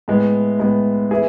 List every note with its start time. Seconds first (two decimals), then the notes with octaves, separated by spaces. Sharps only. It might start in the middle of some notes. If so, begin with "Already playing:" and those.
0.08 A2 G#3 B3
0.59 A2 G#3 B3
1.11 E3 B3 E4 G#4